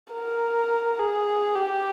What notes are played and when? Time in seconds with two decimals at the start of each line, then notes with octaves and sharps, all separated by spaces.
0.13 A#4
0.99 G#4
1.56 G4